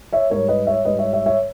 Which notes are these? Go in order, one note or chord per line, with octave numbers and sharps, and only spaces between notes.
C#5 E5
G#2 G3 A#4 C#5
B4 D#5
C#5 E5
G#2 G3 B4 D#5
C#5 E5
C#5 E5
C#5 E5